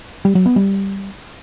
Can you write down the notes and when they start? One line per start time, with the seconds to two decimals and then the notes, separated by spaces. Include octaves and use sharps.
0.25 G3
0.35 F#3
0.46 B3
0.56 G3